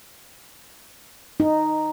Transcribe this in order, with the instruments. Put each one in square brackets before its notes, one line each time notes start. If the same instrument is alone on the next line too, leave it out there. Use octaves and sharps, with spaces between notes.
[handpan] D#4